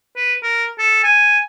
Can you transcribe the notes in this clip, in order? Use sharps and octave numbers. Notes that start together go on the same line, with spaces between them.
B4
A#4
A4
G#5